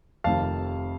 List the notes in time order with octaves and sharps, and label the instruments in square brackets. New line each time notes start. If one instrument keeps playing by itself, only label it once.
[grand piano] F1 F2 C3 D#3 F5 A5